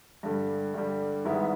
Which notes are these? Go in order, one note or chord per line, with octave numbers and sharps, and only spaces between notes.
G2 D3 G3
G2 D3 G3
G#2 D#3 G3 B3 E4